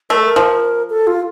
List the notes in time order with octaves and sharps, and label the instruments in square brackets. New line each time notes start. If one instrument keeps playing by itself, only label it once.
[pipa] A3 [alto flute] A#4
[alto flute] A4
A#4
[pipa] F3
[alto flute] A4
F4